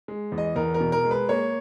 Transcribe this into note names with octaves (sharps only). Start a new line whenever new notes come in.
G#3
E2
D#5
E2 A#4
A#4
B2
A#4
G#3
B4
A#3 C#5